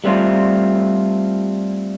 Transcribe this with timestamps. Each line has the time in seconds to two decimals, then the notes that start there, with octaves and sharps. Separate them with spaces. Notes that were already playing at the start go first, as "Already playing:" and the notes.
0.04 G3 A3 C4 F4